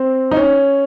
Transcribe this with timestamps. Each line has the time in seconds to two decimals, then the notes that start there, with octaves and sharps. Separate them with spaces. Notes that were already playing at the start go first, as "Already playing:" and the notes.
Already playing: C4
0.31 D#4
0.37 C#4